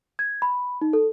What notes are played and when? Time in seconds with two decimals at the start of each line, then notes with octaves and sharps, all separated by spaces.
0.19 G#6
0.42 B5
0.81 D#4
0.93 A4